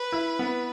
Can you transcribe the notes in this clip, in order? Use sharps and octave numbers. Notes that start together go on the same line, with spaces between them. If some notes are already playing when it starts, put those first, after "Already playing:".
Already playing: B4
E4
B3